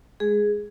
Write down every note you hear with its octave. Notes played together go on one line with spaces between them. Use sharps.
G#3 G#4